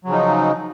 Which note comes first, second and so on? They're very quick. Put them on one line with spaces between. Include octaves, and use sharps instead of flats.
F#3 C#3 F3 D#4